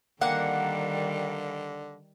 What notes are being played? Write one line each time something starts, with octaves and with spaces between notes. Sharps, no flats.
D3 D#3 G3 A#3 F#5